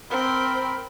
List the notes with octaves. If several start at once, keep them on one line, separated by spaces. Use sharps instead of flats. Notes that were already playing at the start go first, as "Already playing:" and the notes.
C4 A#4 B5